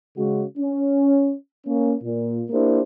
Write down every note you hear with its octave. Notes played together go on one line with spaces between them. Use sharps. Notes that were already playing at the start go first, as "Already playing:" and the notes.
C#3 G#3 F#4
C#4
A#3 C#4
A#2
A#3 D4 E4 G4 A#4 C5